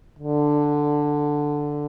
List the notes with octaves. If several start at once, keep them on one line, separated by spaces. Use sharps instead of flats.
D3